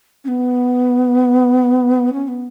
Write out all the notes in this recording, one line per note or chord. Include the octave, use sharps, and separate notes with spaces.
C#4
B3
C#4
B3